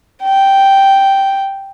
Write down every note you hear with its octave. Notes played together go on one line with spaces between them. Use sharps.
G5